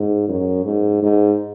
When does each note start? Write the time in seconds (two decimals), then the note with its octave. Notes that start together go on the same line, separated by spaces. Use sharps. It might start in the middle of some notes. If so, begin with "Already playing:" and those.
Already playing: G#2
0.28 F#2
0.65 G#2
1.03 G#2